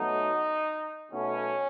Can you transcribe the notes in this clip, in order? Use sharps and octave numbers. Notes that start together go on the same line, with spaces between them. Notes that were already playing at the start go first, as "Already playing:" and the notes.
Already playing: B1 B2 F#3 A3 D#4
B1 B2 F#3 A3 C#4